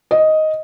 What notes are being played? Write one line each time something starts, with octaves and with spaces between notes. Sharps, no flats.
D#5